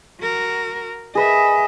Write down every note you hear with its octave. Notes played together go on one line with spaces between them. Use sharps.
F#4 A#4
G#4 B4 D#5 E5